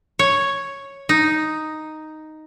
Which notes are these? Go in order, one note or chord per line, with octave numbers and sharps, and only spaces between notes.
C#5
D#4